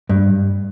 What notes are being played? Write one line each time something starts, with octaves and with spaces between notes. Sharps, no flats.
G2